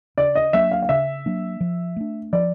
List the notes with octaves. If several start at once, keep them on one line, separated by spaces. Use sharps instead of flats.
C#3 D5
D#5
F#3 A#3 D4 E5
F5
F5
C#3 E5
F#3 A#3 D4
F3
A3 D4
F3 D5